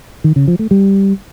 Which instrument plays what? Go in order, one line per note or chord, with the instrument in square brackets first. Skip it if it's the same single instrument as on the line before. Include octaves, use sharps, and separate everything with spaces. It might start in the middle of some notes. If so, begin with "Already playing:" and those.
[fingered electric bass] D#3
C#3
F3
A3
G3